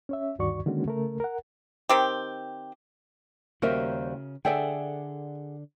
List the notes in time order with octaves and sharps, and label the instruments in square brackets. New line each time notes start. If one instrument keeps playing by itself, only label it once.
[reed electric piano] C#4 C#5 E5
D2 G2 D#3 F#4 D5 C#6
D3 D#3 G#3 A#3 C#4 F#4
C#3 A3 A#4
A#4 F#5
[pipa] D#3 C4 G4
[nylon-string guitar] D#2 G3 C5 [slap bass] C#3 [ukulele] F#4 A#4 E5
[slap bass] D3 [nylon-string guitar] G#4 D5 F#5 [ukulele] A4 E5 G5